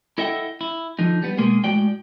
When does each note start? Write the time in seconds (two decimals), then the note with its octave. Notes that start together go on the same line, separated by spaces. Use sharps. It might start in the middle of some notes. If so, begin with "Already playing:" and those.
0.18 E4 A4 D#5 E5 F#5 G5
0.61 E4
0.99 D3 F3 D#4
1.22 G3 B3
1.38 B2 G#3 A#3 G#4
1.64 A2 G#3 F#4 D5 G5